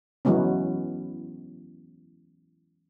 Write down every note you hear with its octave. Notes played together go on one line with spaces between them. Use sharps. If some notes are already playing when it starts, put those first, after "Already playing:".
E3 F#3 G#3 B3 C#4